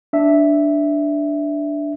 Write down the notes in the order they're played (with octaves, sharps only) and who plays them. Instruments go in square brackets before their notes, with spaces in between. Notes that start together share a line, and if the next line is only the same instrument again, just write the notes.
[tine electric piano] D4 E5